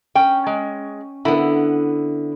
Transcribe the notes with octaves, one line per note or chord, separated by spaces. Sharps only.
C#4 G5
G#3
D3 B3 E4